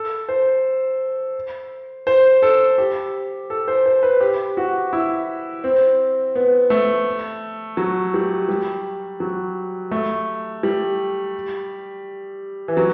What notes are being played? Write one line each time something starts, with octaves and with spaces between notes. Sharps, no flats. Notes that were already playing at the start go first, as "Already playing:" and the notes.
Already playing: A4
C5
C5
A4
G4
A4
C5
C5
B4
G4
F#4
E4
C4
B3
A3
F#3
G3
G3
F#3
A3
G3
E3
F#3